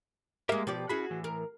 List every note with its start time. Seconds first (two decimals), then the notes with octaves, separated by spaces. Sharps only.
0.49 G#3 A#3 G4 A#4 E5
0.67 B2 F3 G4 D5
0.89 C#4 E4 F#4 G#4 B5
1.10 A2 E3
1.24 A#4